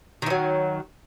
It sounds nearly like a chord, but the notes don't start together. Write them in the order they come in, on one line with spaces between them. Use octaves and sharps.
D#3 E3 F#3